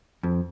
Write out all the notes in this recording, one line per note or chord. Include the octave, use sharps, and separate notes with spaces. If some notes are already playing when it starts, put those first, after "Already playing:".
F2